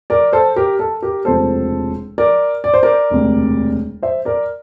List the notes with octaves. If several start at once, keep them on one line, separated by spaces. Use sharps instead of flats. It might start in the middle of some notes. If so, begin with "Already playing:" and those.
A#4 D5
A4 C5
G4 A#4
A4
G4 A#4
E1 D2 C3 F3 A3 A4 C5
A#4 D5
D5
C5
A#4 D5
E1 D2 C3
C5 E5
A#4 D5